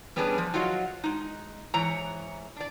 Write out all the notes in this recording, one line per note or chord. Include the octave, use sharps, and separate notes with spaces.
G3 B3 C#4 D4 G#4 B4
F3
F#3 F4 F#4 D#5 F5
G#3 D#4
G#2 E3 C#5 A#5
D4 D5